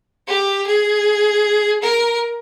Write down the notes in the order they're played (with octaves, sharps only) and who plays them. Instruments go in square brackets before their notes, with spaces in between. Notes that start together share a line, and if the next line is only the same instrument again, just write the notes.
[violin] G4
G#4
A#4